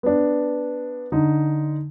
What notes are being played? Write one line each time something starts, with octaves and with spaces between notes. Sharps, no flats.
B3 D4
D3 D#4